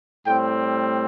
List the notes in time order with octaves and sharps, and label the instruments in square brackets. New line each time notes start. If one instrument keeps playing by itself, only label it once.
[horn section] A2 G3 C4 G5